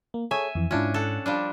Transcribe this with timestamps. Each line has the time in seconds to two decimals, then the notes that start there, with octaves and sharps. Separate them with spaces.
0.14 A#3
0.31 G#4 A4 C#5 E5 G#5
0.55 F2 E3
0.71 G#2 C#4 D4 E4 F4
0.94 A4 F#5
1.26 F3 G3 D4 D6